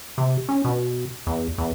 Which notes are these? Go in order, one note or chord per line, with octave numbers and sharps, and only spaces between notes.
C3
C#4
B2
E2
E2